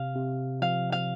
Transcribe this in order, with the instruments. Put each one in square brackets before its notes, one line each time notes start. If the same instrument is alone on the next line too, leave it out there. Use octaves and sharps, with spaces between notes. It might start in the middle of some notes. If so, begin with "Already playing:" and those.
Already playing: [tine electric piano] C3 [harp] F5
[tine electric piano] C3
[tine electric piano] F3 [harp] F5
[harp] F5